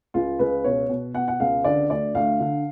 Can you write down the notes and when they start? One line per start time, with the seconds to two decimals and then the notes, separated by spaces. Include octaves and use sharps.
0.14 C#2 F4
0.39 C#2 B4
0.64 B2 C#5
0.89 B2
1.14 B2 F#5
1.28 F#5
1.40 C#2 F5
1.64 D3 D5
1.90 D2 D5
2.15 D2 F5
2.40 D3